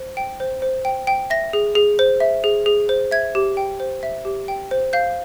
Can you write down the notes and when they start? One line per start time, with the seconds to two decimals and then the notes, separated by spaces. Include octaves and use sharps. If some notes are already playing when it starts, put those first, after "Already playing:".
Already playing: C5
0.17 G5
0.40 C5
0.62 C5
0.85 G5
1.07 G5
1.30 E5 A#6
1.53 G#4
1.75 G#4
1.99 C5
2.20 E5
2.44 G#4
2.66 G#4
2.89 C5
3.11 E5 G#6
3.35 G4
3.57 G5
3.80 C5
4.03 E5
4.25 G4
4.48 G5
4.71 C5
4.93 F5 G6